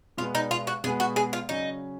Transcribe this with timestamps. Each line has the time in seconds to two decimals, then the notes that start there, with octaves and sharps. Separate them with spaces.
0.18 B2 G#3 B3 F4
0.35 D#4
0.51 F4
0.67 F#4
0.84 B2 G#3 B3 G#4
1.00 F#4
1.16 G#4
1.33 F4
1.49 C#3 F#3 C#4 D#4